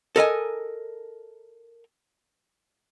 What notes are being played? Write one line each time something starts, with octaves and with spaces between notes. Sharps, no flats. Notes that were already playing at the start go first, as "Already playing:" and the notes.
A4 A#4 D#5 G#5